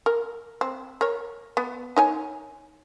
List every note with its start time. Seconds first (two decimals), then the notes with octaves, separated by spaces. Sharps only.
0.06 A#4
0.61 C4
1.01 A#4 C#5
1.57 B3
1.96 D#4 C#5 G#5